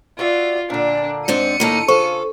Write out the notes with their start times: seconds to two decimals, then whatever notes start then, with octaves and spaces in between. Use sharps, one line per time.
0.19 F4 F#4 D5 E5
0.70 A#2 D3 D4
1.28 G#2 C4 D4 C#7 D#7
1.60 A2 D#3 A#3 D#4 A4
1.88 C#3 F4 A4 C5 C#6